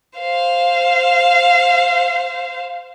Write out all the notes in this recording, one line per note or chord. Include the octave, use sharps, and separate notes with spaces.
C5 F5